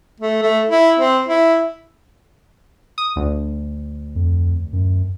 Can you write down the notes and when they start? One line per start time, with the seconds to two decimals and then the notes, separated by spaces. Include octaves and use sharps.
0.20 A3
0.42 A3
0.69 E4
0.99 C4
1.28 E4
2.98 D#6
3.16 D2
4.15 F2
4.73 F#2